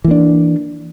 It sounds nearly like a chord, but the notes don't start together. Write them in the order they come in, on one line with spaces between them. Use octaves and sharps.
E3 A#3 D4